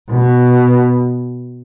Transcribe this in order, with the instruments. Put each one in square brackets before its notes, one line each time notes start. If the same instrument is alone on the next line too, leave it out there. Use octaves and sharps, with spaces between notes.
[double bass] B2